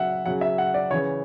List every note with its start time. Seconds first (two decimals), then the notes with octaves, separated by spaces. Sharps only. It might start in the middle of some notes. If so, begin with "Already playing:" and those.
Already playing: C#3 F#3 E5 F#5
0.26 C#3 F#3 F#5
0.41 E5
0.58 F#5
0.74 D5
0.91 C#3 E3 C#5